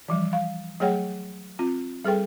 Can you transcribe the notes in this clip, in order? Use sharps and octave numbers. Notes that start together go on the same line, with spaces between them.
E3 F3 G3
F5
F#3 A3 G#4 C#5 F#5 G5
C4 F4
G3 G#4 A4 B4 G5